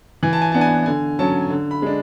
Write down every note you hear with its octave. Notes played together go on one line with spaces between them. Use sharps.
E3 G#5
A5
G#5
B3 D4 A5
G#5
D3 G#5
F#3 C#4 A5
D3
B5
G#3 D4